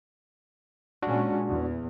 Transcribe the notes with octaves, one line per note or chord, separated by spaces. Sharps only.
A#2 G#3 C#4 D4 F#4
E2